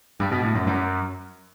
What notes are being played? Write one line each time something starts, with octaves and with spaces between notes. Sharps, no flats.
G2
B2
A2
F#2
F#2